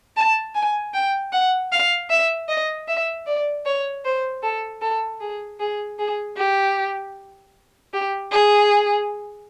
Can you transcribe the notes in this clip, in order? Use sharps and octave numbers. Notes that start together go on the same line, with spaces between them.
A5
G#5
G5
F#5
F5
E5
D#5
E5
D5
C#5
C5
A4
A4
G#4
G#4
G#4
G4
G4
G#4